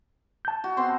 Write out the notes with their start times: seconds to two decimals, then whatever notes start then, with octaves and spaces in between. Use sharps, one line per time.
0.45 A5 G6
0.64 F#4
0.77 B3 C4 C6